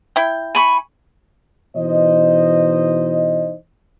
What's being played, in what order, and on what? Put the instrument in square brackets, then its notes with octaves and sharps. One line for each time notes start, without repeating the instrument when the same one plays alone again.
[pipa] E4 G5
[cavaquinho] G#5 B5 C#6
[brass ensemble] B2 E3 D#4 C5 D#5